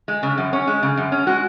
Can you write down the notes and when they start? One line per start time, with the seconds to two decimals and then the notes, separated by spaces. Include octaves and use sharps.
0.08 G#3
0.23 C#3
0.38 F#2
0.53 C#4
0.67 G#3
0.83 C#3
0.97 F#2
1.12 C#4
1.27 G#3 F#4